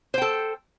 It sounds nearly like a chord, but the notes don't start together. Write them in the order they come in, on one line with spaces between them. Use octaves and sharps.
C5 G5 A4